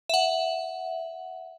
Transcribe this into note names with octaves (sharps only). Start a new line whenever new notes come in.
E5 F#5